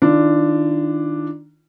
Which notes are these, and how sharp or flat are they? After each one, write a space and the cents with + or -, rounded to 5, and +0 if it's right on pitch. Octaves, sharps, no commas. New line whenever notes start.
D#3 +0 D4 +0 F4 -35